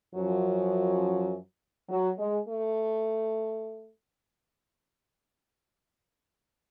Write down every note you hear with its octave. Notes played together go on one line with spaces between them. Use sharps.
F#2 F3 F#3
F#3
G#3
A3